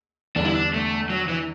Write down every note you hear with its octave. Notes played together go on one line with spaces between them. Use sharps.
E2 D3 G3 D4
E4
D4
A3
F#3
E3